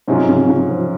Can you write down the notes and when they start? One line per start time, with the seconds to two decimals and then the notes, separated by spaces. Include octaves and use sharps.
0.08 G#2 C3 F#3 C#4 F4
0.29 C#3
0.44 C3
0.49 C#3
0.70 F3